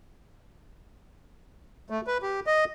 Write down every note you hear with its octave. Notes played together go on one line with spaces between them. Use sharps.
A3
B4
G4
D#5